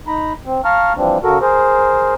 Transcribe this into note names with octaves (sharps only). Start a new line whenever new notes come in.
D#4 A#5 B5
C4
F5 A5 A#5 C#6 F6
E3 F3 G3 C4 D4
C#3 F#4 A4 A#4
G#4 A#4 C5